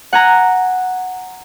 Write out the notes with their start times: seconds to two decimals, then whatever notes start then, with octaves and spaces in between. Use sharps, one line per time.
0.13 F#5 G#5 A#5